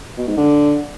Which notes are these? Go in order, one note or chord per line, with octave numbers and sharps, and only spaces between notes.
B2
G#2
D3